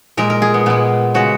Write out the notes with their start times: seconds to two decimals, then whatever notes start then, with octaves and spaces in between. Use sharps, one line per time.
0.17 A#2 G#3 A#4
0.30 A#4
0.42 G#4
0.54 B3
0.66 A#2 G#3 B3
1.14 C#3 G#3 F#4